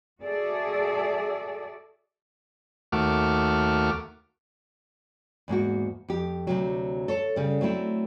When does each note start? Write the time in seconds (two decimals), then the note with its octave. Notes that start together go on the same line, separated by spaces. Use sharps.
0.22 F#4 G#4 A4 D5 E5
2.92 D#2 A3 F#4 D6 F6
5.48 E2 G#2 A#3 F#4
6.08 F2 G4
6.47 D2 C3 F#3
7.08 A4 C#5
7.36 C#3 G3
7.61 F#3 A3 C4 E4